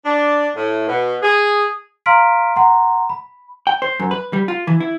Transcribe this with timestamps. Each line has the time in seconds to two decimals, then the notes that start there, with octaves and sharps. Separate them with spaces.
0.04 D4
0.56 A2
0.87 B2
1.22 G#4
2.06 F5 A#5 C6 F6 B6 D7
2.56 F#5 A#5 C6
3.10 B5
3.67 G5
3.82 C5
4.00 F#2
4.11 B4
4.33 G3
4.48 F4
4.67 E3
4.80 E4